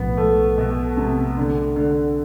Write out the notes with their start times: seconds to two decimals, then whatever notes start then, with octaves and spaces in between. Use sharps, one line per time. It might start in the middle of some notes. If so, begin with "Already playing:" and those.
Already playing: B1 A2 F3 B3
0.17 A3
0.58 B2
0.97 C3
1.37 D3
1.76 D3